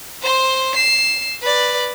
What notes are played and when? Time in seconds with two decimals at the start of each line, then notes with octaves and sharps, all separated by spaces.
0.22 C5 C6
0.75 C7 E7
1.42 B4 D5